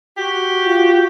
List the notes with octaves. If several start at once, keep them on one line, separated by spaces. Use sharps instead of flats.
F#4 G4
F4